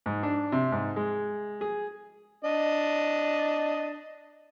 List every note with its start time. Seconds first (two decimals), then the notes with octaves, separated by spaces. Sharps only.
0.06 G#2
0.23 D4
0.52 C3
0.72 G#2
0.96 G#3
1.61 G#4
2.45 D4 D#5